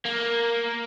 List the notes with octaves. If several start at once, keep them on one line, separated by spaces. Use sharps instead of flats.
A#3